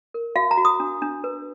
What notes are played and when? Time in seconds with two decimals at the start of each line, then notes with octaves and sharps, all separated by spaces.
0.14 A#4
0.36 F#4 F5
0.51 A#5
0.57 F#4
0.65 D#6
0.80 D4
1.02 D4
1.24 B4